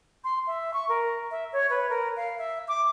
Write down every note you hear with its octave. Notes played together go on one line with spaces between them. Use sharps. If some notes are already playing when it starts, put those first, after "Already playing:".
C6
E5
C#6
A#4
E5
C#5
B4
A#4
F5
E5
D6